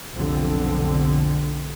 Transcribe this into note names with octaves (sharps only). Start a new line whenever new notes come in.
F1 B1 D3 F3 C4